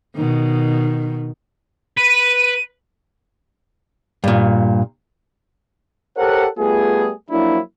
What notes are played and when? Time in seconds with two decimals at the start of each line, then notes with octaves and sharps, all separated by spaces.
0.16 B2 D#3
1.97 B4 D#7
4.24 G2 A#2
6.16 G4 A4 A#4 C5 C#5 F#5
6.57 G3 A3 B3 F4 G#4
7.30 F3 F#3 A#3 D4 E4